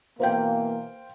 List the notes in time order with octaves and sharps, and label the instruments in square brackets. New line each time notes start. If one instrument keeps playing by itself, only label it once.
[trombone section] B2 E3 A#3 [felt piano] C5 F5 G5